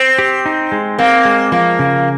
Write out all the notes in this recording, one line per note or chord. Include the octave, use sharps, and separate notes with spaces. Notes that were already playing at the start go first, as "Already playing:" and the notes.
Already playing: C4
G4
D#4
G#3
A#3 C4
G#3
F3 A#3
C#3